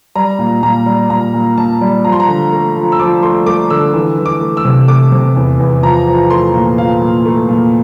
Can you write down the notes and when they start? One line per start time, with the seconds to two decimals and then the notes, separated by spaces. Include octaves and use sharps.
0.16 G3 A#5
0.39 A#2
0.63 A#2 A#5
0.86 G3
1.10 A#2 A#5
1.34 A#2
1.58 A#2 A5
1.81 G3
2.05 F3 A#5
2.12 C6
2.20 A#5
2.28 D3
2.52 A3
2.76 F3
2.92 E6
2.99 F3 D6
3.23 A3 C6
3.46 A3 D6
3.70 D3 E6
3.94 E3
4.18 E3
4.26 D6
4.41 A3
4.57 E6
4.65 C3
4.88 A3 D6
5.12 C3
5.36 E2
5.60 E2
5.83 F3 A#5
6.07 F3
6.30 A3 C6
6.54 A#2
6.78 F3 F5
7.01 A#2
7.25 A3
7.49 A#2